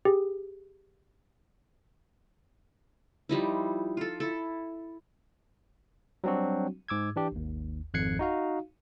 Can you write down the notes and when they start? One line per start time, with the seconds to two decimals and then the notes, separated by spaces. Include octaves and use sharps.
0.05 G4 G#4
3.29 F3 G3 D#4 E4
3.97 F4 A4
4.20 E4 A4
6.24 F#3 G3 C4 D4 F#4
6.88 G#2 D6 E6 G#6
7.16 E3 D4 G4
7.32 G#1 D#2
7.94 G#1 F2 F#6 G#6 C7 C#7
8.19 D#4 F#4 F5